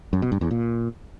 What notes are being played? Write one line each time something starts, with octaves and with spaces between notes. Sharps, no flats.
F#2
B2
G2
E2
A#2